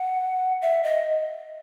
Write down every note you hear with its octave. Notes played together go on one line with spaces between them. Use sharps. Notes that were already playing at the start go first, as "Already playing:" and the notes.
Already playing: F#5
E5
D#5